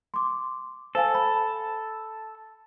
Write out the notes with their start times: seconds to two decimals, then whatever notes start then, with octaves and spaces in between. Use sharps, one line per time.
0.14 C6 D6
0.95 A4 C5 F5 G#5
1.15 B5